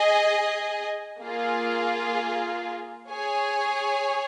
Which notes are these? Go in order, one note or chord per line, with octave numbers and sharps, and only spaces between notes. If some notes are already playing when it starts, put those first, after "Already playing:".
Already playing: G#4 D#5 G#5
A#3 F4 G#4
G#4 C#5 G#5